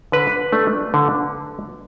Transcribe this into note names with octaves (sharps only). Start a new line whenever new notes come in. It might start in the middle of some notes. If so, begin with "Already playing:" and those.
D3 B4
A3 D4
D3